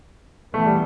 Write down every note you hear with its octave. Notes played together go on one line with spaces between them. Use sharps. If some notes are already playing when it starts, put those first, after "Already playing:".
E3 A3 B3
G3